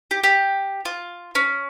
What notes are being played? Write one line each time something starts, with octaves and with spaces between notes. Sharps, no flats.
G4
G4
F4
C#4